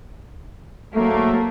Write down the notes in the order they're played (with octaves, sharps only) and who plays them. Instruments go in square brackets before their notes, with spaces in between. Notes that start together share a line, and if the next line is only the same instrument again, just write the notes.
[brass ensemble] G#2 F#3 A3 [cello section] A#3